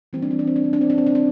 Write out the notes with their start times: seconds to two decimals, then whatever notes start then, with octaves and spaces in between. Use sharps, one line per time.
0.13 E3 G3 A#3 C4
0.22 D4
0.31 C4
0.39 D4
0.47 C4
0.56 D4
0.64 C4
0.73 D4
0.81 C4
0.90 D4
0.98 C4
1.06 D4
1.15 C4